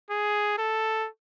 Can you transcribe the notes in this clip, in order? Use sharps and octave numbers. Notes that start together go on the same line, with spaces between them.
G#4
A4